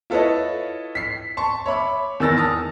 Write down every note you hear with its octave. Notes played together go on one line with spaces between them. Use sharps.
E4 F4 A4 B4 C#5 D#5
B6 C7
A5 C6 C#6
C#5 E5 B5 D6
E2 D#3 E6 A6 A#6
A5 D#6 F6